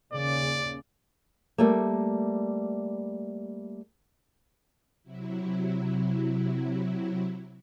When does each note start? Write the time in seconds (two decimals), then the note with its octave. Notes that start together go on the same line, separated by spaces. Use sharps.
0.13 D#2 C#3 D5
1.58 G3 A3 A#3
5.03 C3 F#3 E4